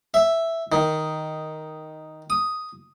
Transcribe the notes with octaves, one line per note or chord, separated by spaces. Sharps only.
E5
D#3
D#6